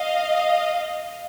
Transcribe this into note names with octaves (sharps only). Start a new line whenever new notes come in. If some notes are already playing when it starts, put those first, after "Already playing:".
Already playing: D#5 F5